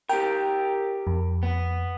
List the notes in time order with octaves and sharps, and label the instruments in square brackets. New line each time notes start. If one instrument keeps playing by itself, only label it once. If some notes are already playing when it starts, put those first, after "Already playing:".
[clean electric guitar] G4 A#4 [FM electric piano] G5
[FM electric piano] F2
[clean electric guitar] B3